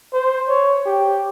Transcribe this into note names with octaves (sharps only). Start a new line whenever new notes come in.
C5
C#5
G4